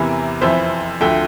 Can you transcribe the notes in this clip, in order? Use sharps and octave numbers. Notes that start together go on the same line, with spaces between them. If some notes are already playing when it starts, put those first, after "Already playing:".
Already playing: E2 C3 E3 A#4
F2 E3 C5 E5
D2 D3 F3 E5 G5